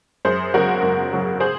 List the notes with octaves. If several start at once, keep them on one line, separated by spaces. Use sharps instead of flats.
F#2 G#4 C5
C#3 F#3 F#4 A#4
F#2
C#3 F#3
G#4 C5